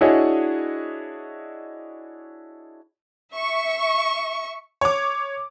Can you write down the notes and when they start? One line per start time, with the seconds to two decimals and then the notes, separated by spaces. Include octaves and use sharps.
0.01 D4 E4 F#4 G#4 C#5 D#5
3.33 E5 C#6
4.81 C#5 D6